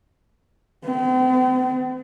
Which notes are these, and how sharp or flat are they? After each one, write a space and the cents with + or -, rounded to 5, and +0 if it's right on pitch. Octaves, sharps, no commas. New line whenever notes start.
C4 -45